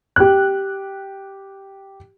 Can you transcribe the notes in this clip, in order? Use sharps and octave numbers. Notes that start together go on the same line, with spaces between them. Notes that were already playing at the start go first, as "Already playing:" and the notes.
G4 F#6